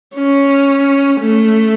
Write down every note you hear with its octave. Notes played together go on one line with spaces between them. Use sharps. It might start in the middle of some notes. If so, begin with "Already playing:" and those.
C#4
A3